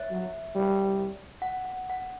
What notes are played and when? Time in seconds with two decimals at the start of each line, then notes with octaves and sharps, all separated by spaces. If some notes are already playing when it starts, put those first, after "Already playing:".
Already playing: C#5 E5
0.11 F#3
0.55 G3
1.42 F#5
1.65 F#5
1.90 F#5